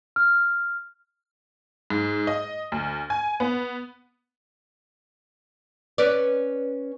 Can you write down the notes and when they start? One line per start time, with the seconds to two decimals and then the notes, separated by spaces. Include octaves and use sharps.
0.16 F6
1.90 G#2
2.27 D#5
2.72 D2
3.10 G#5
3.40 B3
5.98 C#4 B4 D5